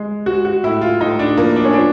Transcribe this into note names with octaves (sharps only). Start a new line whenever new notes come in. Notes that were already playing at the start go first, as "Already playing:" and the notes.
Already playing: G#3
G#3 F#4
F#4
A2 E4
F4
A2 D#4
D4
F3 A#3
D4
C#4
F3 D4